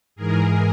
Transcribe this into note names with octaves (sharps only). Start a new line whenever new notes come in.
G#2 E3 G#4 A#4